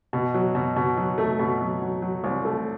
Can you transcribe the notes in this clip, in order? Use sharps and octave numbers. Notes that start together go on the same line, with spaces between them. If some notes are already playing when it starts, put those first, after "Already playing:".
B2
F#3
B2
B2
F#3
A3
B2
F#3
F#3
F#3
C2
A3